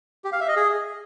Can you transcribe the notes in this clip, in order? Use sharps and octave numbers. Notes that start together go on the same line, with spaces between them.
G4
F5
E5
D#5
G#4